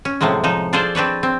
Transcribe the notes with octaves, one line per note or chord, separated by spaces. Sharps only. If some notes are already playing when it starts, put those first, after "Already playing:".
C#4
A2 C3 F3 F#3 G#3
F3 D#4
D4 F4 G#4 A4 C5 D5
C4 D4 B4 C#5
C4